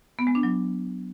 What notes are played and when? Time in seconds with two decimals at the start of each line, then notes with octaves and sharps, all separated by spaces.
0.19 B3
0.27 G#3
0.35 D4
0.43 F#3